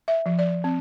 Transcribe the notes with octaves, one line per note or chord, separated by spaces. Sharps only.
E5
F3
D5
C4